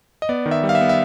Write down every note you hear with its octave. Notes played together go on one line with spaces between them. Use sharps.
D#5
B3 D5
D#3
E5
G3
F5
E5
B3
E5